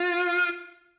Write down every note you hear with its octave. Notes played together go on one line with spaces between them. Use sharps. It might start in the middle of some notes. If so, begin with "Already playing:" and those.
Already playing: F4